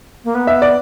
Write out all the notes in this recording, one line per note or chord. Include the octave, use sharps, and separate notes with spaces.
A#3
B3
E5
D5